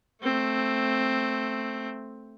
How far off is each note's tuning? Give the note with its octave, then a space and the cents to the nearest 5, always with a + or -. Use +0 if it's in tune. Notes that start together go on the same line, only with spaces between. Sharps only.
A3 +0 C4 +5